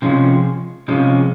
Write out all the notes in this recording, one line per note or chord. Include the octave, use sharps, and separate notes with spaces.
C3 F3 G#3 C#4
C3 F3 G#3 C#4